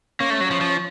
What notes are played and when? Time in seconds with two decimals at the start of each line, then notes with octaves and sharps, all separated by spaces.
0.20 A#3 C#4
0.30 A3
0.41 F#3
0.51 F3
0.61 F3